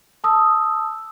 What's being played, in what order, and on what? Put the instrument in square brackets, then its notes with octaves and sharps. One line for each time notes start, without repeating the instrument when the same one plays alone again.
[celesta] A5 D#6 E6